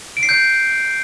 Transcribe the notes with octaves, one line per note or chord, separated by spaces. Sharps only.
D7
C7
G6